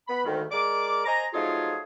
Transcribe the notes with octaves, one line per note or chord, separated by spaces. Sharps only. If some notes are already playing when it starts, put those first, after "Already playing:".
B3 B5
D2 G#2 D#3
G#3 A#4 D5 D6
C5 D#5 G#5 A#5
F3 F#3 A3 D#4 F4 G#4